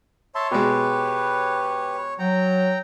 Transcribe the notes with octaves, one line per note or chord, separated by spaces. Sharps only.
C#5 E5 A5 C6
B2 G#3 G4 B4
F#3 G5 A#5